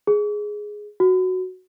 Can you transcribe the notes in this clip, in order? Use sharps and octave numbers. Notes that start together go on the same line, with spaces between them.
G#4
F#4